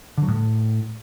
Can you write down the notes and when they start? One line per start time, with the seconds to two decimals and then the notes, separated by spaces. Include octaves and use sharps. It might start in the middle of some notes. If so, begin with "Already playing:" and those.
0.18 D3
0.23 F#3
0.28 A2